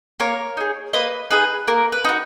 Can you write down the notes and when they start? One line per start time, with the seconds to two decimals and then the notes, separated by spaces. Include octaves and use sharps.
0.20 A#3 A#4 C#5
0.57 D#4 G#4
0.93 A#3 B4 D#5
1.31 D#4 G#4 B4
1.67 A#3 A#4
1.92 B4
2.04 D#4 F#4